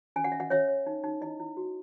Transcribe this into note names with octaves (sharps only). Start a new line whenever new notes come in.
C#4 G#5
F#5
C#4 E5
D#5 F#5
C#4 C#5 E5
C#5
D#4
D#4
E4 D#5
E4
F#4